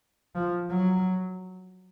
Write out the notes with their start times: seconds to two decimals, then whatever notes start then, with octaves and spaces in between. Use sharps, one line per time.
0.35 F3
0.70 F#3